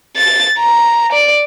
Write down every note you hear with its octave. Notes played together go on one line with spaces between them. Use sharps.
A6
A#5
D5